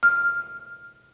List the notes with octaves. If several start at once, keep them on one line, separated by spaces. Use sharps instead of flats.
F6